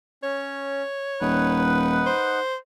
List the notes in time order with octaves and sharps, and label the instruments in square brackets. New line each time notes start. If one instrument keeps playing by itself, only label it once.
[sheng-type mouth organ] C#4 [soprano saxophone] C#5
[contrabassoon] D#1 [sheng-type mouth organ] D#4 F#5 [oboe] B4
[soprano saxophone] C5